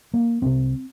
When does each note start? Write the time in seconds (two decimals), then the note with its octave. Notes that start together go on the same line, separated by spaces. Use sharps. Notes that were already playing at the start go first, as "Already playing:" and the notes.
0.14 A#3
0.42 C2 C3 C4